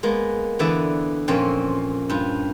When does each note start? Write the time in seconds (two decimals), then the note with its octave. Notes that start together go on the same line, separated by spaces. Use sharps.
0.03 G#3 A#3 B3
0.59 D3 E3 B3 D5 E5
1.28 F2 A#2 C4 C#4 F5
2.09 G2 F4